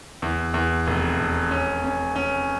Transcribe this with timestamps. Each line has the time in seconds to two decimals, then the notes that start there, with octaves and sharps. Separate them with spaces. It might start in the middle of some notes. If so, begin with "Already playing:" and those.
0.22 E2
0.54 E2
0.87 F1
1.19 F1
1.51 C#4
1.84 C#4
2.16 C#4